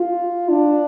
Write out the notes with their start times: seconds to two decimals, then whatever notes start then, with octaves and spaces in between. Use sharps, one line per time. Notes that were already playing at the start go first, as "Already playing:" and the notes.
Already playing: F4
0.49 D4